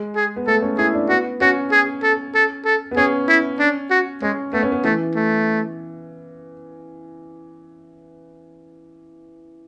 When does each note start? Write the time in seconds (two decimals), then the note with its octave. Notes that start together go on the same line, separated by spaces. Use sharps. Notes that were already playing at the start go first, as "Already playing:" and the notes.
Already playing: G#3
0.16 G#4
0.36 B3
0.47 A3 A4
0.62 C#4
0.78 E4 G#4
0.94 D4
1.09 B3 F#4
1.41 C#4 F#4
1.72 G#4
2.03 A4
2.35 A4
2.66 A4
2.91 B3
2.96 C#4 G#4
3.28 E4
3.59 D4
3.91 F#4
4.22 G#3 C#4
4.53 A3 B3
4.63 C#4
4.72 B3
4.84 E3 A3
5.15 A3